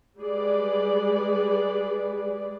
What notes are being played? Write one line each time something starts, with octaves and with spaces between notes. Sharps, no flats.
G3 G#3 G#4 B4 D5